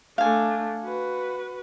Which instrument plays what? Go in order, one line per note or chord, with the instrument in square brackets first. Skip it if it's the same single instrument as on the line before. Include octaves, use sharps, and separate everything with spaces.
[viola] A3 D4 [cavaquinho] F5 G#5
[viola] F#4 B4